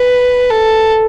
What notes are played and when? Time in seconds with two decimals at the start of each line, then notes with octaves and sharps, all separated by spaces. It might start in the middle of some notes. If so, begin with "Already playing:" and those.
Already playing: B4
0.50 A4